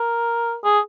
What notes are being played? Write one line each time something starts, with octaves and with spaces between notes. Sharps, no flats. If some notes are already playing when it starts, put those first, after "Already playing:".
Already playing: A#4
G#4